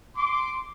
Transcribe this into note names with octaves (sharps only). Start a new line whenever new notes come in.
C6 D6